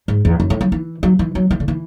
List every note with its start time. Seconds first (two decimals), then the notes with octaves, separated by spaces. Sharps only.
0.08 G#2
0.25 E2
0.40 F#2
0.50 A2
0.61 F#3
0.72 E3
1.03 F#3
1.19 E3
1.35 F#3
1.50 E3
1.60 D3
1.68 E3